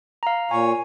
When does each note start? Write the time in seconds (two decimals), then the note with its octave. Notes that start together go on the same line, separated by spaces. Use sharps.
0.23 F5 A#5
0.51 A#2 C#5 G#5